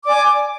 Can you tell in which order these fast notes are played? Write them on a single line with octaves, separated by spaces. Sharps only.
D6 D5 G#5